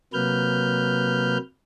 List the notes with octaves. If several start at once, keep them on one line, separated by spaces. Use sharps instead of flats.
C3 F#3 A#3 B4 F6 G6